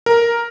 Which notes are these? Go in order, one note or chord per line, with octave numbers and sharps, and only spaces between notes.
A#4